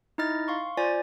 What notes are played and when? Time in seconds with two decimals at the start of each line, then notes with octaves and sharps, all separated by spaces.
0.18 D#4 E4 D#5 F6 A6
0.48 F5 C6 C#6
0.77 F4 C5 D5 G#5 A6